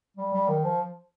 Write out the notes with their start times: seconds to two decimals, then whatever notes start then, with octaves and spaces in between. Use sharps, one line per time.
0.17 G3
0.33 G3
0.48 D#3
0.64 F3